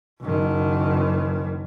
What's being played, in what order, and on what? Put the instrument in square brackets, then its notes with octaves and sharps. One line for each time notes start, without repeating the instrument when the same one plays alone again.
[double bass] F#1 D#3